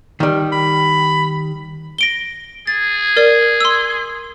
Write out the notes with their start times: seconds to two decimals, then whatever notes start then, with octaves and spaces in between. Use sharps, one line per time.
0.20 D#3 G3
0.52 B5
1.98 A#6 D7 G7
2.67 G#4 A6
3.17 A#4 D5
3.61 C6 E6